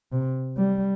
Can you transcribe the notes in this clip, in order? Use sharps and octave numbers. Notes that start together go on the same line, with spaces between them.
C3
G3